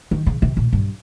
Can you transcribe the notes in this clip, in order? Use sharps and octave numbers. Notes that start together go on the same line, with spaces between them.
D#3
C#3
C3
A#2
G2